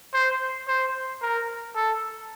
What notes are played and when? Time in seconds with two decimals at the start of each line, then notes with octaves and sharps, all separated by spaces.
0.14 C5
0.68 C5
1.22 A#4
1.76 A4